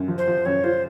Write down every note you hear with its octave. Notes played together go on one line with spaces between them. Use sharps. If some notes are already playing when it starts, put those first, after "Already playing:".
Already playing: F#2
F3
C5
F3
F#2 C#5
F4 C5